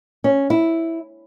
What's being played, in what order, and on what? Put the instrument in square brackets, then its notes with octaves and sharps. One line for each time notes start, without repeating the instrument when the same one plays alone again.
[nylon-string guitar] C#4
E4